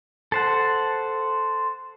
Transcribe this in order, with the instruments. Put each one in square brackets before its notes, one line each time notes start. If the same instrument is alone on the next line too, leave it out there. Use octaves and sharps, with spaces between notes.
[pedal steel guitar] A4 C5 F#5